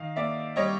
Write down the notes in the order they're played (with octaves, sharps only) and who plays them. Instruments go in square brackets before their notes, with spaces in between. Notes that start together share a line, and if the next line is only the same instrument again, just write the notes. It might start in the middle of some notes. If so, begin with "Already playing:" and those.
Already playing: [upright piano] D#3 D#5 F5
A#3 D5 E5
G3 C#5 D#5